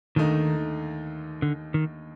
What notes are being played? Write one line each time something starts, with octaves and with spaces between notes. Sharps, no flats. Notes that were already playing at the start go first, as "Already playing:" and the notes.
D#2 D3 D#3 A3 D#4
D3
D#3